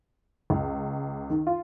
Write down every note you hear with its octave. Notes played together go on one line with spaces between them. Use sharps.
C#2
D#3
F4